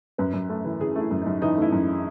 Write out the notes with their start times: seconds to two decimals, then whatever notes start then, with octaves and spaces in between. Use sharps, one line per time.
0.18 F#2 B4
0.34 F#2
0.49 A3
0.65 E3
0.80 E3 G#4
0.95 A3 E4
1.11 F#2
1.21 D#4
1.27 F#2
1.42 E3 D#4
1.57 A3 E4
1.73 F#2